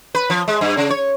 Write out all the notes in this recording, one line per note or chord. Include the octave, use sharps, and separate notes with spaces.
B4
F3
G#3
G2
C#3
C#5